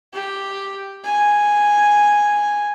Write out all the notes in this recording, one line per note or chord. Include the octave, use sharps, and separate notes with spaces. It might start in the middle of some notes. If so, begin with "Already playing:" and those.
G4
G#5